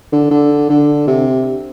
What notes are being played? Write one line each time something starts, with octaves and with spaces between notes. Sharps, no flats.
D3
D3
D3
C3